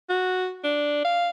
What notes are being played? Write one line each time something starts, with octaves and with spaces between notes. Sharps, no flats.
F#4
D4
F5